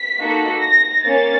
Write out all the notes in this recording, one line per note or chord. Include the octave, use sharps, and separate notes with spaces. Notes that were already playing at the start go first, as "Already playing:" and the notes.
Already playing: B6
A#3 D#4 F#4 A4
A#6
A#3 C#4 A6